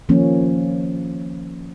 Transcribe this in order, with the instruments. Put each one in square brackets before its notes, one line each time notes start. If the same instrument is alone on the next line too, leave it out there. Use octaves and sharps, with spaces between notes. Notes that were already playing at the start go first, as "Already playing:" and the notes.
[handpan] D#3 F3 A#3 C#4